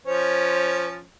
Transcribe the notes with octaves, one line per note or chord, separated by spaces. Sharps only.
F3 C#4 C5 C#5